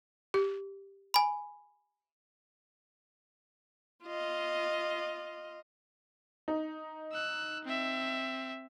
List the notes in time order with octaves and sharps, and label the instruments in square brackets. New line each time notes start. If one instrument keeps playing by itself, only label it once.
[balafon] G4
[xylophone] G#5 B5
[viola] F4 D#5
[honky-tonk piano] D#4
[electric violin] E6 F#6
C4 E5